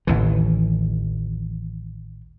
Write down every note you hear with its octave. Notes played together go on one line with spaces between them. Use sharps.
A1 D#2 E3